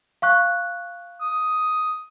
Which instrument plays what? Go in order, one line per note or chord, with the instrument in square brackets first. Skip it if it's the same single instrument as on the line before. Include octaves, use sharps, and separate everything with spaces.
[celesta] F5 C#6 F#6
[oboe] D#6